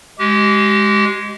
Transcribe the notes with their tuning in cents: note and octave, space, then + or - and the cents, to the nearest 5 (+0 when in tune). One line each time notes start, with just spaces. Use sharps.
G#3 +0 G4 -30